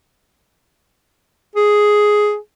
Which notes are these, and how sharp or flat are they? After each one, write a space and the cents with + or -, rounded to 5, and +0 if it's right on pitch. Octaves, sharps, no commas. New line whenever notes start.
G#4 +5